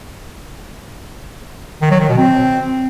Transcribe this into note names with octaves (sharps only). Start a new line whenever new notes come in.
D#3
F#3
D#3
B2
C4